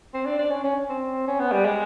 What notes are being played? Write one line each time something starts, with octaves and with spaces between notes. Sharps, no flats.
C4
D4
D4
C#4
C#4
C4
C#4
B3
G3
G#3